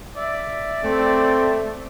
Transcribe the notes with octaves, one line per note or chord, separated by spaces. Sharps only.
D5 E5
A3 C4